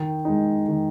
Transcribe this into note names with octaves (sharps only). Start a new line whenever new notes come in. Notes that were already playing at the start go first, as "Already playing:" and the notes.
Already playing: D#3
G#3 D#4
D#3